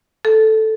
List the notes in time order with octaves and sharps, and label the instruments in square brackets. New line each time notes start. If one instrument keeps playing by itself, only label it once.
[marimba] A4